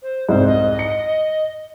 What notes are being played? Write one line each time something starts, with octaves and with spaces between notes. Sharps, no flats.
C5
C2 F2 G#2 C5
D#5
C#7